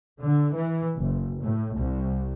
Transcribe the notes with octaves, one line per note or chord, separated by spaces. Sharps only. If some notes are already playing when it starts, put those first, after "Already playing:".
D3
E3
F#1
A2
C2